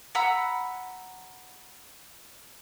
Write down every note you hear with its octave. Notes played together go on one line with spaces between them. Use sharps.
F#5 A#5 B5 E6